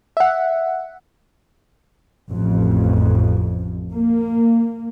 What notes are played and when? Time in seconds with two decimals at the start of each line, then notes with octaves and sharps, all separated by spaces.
0.17 E5 F#5
2.31 A1 F2
3.91 A#3